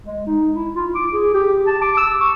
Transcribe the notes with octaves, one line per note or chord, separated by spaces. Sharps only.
G#3
D#4
E4
F4
D6
G#4
G4
A5
D6
E6
C#6